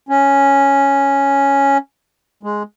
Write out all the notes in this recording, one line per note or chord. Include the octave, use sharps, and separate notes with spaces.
C#4
G#3